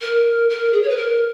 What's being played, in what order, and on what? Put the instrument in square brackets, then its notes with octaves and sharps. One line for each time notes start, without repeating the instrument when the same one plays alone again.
[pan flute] A#4
A#4
G#4
C#5
B4
A#4